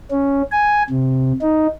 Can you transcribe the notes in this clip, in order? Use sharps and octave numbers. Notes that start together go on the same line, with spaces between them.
C#4
G#5
C3
D#4